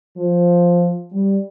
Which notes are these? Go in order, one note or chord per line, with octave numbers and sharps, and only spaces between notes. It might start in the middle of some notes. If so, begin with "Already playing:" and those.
F3
G3